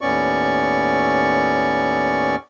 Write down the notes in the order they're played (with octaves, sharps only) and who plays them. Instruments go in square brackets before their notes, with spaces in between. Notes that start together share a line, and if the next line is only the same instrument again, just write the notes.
[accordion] D#2 A2 B3 C#4 D5 C#6